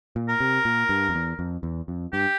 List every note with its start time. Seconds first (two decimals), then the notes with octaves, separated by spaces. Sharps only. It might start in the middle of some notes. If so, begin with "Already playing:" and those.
0.16 A#2
0.28 A#4
0.40 C3
0.65 A#2
0.89 G2
1.09 F2
1.15 E2
1.39 F2
1.63 E2
1.88 F2
2.12 G2 G4